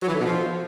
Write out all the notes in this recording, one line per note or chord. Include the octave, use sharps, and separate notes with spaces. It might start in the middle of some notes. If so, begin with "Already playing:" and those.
F#3
E3
D3
B2
F3